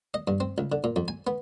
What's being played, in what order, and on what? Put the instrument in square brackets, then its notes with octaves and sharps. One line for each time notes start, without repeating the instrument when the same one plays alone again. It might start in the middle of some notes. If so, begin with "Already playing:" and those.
[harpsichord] D#5
G2
C4
C#2
D3
A#2
F2
G#5
B3